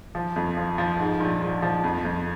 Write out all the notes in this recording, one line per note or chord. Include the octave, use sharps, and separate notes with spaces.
F3
F2
F3
F3
G#2
A#1
A#1
F3
F2
F2